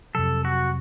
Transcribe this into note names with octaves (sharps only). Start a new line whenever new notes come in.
F2 C3 F#3 A4
F#4